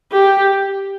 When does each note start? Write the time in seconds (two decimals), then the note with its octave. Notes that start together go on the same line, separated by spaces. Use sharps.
0.12 G4